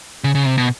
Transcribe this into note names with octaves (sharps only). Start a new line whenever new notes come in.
C#3
C#3
C3
B2